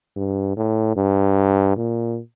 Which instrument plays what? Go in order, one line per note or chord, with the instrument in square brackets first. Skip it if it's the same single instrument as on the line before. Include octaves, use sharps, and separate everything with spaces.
[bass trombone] G2
A2
G2
A#2